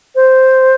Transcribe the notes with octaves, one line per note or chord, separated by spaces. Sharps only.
C5